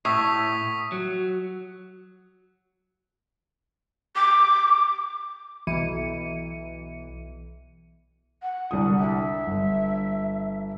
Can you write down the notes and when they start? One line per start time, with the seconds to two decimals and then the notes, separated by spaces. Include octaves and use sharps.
0.05 A2 C#6 D#6 B6
0.92 F#3
4.16 D6
5.67 B1 E3 C#7 D#7
8.42 F#5
8.71 C2 D3 D#6
8.99 E5
9.47 G1